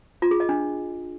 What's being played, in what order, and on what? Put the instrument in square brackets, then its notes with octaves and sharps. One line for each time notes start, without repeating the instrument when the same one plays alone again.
[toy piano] F4
G#4
D#5
D4